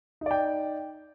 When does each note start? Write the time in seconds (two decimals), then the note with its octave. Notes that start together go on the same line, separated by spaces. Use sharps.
0.21 D#4
0.26 D5
0.31 G5